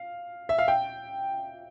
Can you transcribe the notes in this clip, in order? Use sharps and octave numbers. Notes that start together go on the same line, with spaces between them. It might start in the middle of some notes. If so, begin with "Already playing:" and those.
Already playing: F5
E5
F5
G5